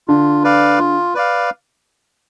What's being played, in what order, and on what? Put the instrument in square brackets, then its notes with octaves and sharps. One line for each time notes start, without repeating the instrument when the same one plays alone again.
[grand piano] D3 [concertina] F4
[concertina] B4 D5 F5
F4
B4 D5 F5